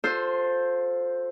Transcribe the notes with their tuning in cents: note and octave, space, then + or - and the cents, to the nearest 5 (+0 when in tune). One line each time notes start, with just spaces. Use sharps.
F4 +30 A4 +0 C5 +0